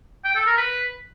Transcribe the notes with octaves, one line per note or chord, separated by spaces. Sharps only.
G5
A4
A#4
B4